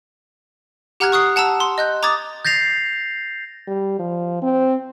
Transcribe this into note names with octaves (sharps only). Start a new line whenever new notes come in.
G4 F#5 A#5 F6 F#6 G#6
C#6 D#6 F#6 C7
F#5 A5 A#5 E6
C6
D#5 F#6 G6
A#5 D6 D#6 G#6 A6
G6 A6 A#6 C7 F7
G3
F3
C4